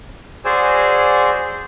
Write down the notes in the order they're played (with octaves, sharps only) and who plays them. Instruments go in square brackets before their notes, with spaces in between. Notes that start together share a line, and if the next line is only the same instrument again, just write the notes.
[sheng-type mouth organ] F#4 G#4 C5 D5 G#5 E6